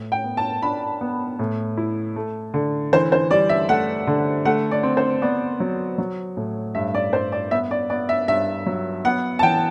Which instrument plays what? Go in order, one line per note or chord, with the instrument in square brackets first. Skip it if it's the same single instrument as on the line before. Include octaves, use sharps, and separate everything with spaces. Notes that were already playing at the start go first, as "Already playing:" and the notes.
Already playing: [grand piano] A2
[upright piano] G5
[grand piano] B3
[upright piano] A5
[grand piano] D4 [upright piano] B5
[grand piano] B3
A2
E4
A3
D3
[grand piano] E3 [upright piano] C5
[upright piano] C5
[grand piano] G3 [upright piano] D5
[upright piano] E5
[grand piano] A3 [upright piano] F#5
[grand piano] D3
[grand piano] A3 [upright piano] F#5
[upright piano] D5
[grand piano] C4
[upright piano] C5
[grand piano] B3 [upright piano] D5
[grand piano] F#3
F#3
A2
[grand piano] G2 [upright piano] E5
[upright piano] D5
[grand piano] G2 [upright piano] C5
[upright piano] D5
[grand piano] B3 [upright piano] E5
[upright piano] D5
[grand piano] B3 [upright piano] D5
[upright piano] E5
[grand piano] G2 [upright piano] E5
[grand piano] F#3
[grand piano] B3 [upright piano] F#5
[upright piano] A5
[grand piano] E3 [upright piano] G5